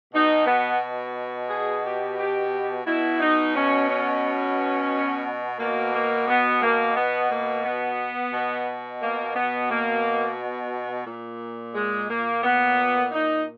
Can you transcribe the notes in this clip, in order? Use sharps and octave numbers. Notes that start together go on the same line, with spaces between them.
B2 D#4
B3
G#4
G4
G4
B2 E4
D#4
C#4
C#4
B2 A#3
A#3
B3
A#3
B3
A#3
B3
B2
A#3
B3
A#3
A#2
G#3
A#3
B3
D#4